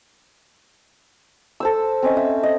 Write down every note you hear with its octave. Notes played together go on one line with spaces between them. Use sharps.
A4 C5 E6
C4 C#4 D#5
E5
D#5